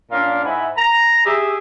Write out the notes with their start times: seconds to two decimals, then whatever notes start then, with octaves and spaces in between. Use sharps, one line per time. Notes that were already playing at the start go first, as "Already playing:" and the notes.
0.12 A#2 C#4 D4 F5
0.45 G#2 E4 E5 F#5 G#5 B5
0.77 A#5
1.25 G4 G#4 E5